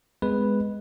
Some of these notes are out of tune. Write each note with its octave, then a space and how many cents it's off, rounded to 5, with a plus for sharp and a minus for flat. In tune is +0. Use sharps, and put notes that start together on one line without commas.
G#3 +0 B3 +35 B4 +0